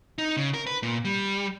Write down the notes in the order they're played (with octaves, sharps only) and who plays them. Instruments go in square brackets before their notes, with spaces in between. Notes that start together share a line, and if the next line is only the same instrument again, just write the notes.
[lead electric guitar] D#4
C#3
A#4
B4
A#2
G3